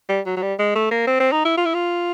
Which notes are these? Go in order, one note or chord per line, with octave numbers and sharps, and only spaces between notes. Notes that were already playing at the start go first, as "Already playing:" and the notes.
G3
F#3
F#3
G3
G#3
A3
A#3
C4
C4
D#4
E4
F4
E4
F4